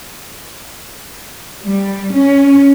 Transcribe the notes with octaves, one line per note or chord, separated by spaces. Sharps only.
G3
C#4